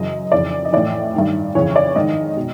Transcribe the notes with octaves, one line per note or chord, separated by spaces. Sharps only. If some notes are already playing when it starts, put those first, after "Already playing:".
Already playing: F#2 C#3 E3 D#5
F2 C#3 E3 D5
D#5
A2 E3 D5
G2 D#3
F2 C#3 E3 C#5
D5
G#2 D#3 D#5
B2